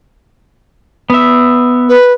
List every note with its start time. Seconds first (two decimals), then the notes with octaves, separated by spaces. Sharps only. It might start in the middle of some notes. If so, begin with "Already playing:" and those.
1.10 B3 E5
1.89 B4